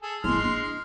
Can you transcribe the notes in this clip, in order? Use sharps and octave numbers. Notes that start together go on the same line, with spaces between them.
G#4 A4
G#3 A#3 E4 C6 F6
D4